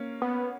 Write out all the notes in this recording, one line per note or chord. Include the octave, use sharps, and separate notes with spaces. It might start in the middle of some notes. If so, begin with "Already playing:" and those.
Already playing: A#3 C#4
B3